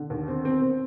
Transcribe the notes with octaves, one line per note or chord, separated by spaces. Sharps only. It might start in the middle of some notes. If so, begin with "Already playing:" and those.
Already playing: D3
D#2
C4
C4
C4